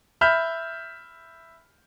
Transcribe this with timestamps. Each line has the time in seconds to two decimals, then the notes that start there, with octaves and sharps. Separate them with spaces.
0.21 E5 B5 F6 G6